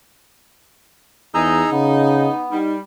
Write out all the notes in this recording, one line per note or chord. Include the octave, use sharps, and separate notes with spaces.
E2 D#4 G#4 A#5 E6
C#3 B3
G3 D#4